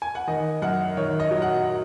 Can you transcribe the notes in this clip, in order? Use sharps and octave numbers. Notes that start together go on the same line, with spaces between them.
G#5
F#5
D#3 D#5
F#2 F#5
D#3 C#5
D#5
F#3
F#5